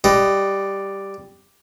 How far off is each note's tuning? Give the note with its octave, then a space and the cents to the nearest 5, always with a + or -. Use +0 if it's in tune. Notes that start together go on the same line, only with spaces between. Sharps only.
G3 +0 B4 +20 D#5 +0